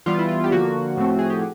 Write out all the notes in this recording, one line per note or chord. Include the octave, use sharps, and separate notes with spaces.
E3 G3 B3 F4
E4
F4
G4
D3 F3 A#3 F#4
A2 F3 A3 C4
G#4
G4